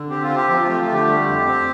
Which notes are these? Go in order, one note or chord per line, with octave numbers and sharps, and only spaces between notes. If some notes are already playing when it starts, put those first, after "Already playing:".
Already playing: D3
C4 G4
F4
C3
G4
F3
F4
A3 G4
F4
D3
G4
G3
F2
C4